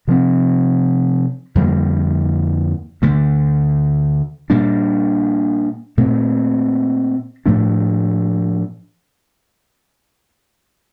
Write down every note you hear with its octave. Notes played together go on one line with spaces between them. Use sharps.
C3 F3 C4
F2 D3 G3 A#3
D2 D3 A3
A#2 G3 A#3 D4
A#2 A3 C4
A2 F3 A3 D4